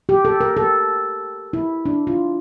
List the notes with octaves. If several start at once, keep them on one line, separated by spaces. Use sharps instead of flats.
G4
A4
A#4
A4
E4
D4
F4